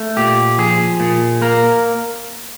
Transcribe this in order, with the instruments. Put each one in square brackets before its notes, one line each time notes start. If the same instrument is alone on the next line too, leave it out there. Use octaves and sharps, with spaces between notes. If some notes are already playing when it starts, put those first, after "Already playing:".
Already playing: [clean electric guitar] A3
A#2 G4
F3 G#4
A#2
A#3 A#4